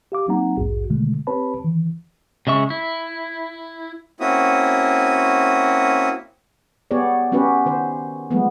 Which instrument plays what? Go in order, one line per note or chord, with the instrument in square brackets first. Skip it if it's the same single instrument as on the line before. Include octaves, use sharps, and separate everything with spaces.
[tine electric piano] G4 F5 D6
F#3 A#3 C4 D#4 F#5 A#5
A#1 D#2 G#2 F#4 G#4
B2 D3 D#3 G#3 A3
C4 G4 B4 C#5 A5 B5
D#3 E3
[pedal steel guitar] C#3 G#3 E5 C#6
E4
[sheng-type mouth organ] A#3 C4 C#4 E4 F#4 D#6
[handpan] B3 G4 G#4 C#5 D5
B3 C#4 F#4 G4 B4
D#3 C5
F3 F#3 G#3 A3 B3